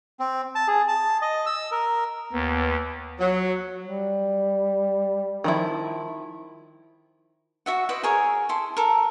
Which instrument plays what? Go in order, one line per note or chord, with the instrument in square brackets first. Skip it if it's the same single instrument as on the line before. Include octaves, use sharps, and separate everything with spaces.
[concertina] C4
A5
G#4
A5
D#5
E6
A#4
[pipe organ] D#2 [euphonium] B3
[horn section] F#3
[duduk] G3
[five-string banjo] D#3 F3 E4
[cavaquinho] F#4 E5 F#5
E4 B4 C5 D#5
G#4 A#4 C#5
E4 A4 C6
A4 A#4